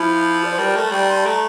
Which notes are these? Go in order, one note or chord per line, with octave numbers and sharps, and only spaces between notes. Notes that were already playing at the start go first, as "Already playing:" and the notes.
Already playing: F3 E4
D5
C5
G3 A#4
A3
G3 G5
A#5
C6
A5
A3 A#5